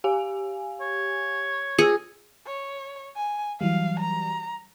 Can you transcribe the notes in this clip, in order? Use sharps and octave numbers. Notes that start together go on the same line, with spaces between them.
G4 F5 G#5
C#5
F4 G#4 E6
C#5
G#5
E3 F#3 G3 F5
A#5